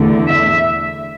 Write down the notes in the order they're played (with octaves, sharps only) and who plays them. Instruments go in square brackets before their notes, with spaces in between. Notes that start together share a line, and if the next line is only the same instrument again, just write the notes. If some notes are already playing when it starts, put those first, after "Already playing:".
Already playing: [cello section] E2 D3 A3
E5